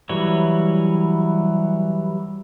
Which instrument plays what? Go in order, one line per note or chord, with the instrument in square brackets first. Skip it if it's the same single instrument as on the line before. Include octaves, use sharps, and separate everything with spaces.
[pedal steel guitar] E3 F#3 G3 C#5